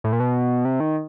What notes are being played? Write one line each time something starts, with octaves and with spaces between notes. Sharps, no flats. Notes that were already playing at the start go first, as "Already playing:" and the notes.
A2
A#2
B2
C3
D#3